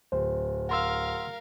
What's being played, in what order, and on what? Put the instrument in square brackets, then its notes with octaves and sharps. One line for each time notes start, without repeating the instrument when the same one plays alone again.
[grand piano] D1 [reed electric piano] C5
[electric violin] A#4 F5 [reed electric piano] F#5 C6 E6